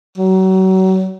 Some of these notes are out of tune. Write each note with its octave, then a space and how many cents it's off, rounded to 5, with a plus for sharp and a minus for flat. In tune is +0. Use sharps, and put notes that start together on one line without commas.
F#3 +30